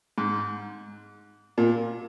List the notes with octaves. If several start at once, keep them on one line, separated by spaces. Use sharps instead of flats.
G#2
A#2